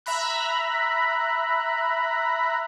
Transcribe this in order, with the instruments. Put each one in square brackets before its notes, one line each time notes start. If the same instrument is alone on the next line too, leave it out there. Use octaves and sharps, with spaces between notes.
[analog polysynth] E5 A#5 B5 F#6